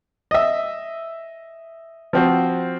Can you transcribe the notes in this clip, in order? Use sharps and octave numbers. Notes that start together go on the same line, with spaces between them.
D#5 E5
F3 C4 F#4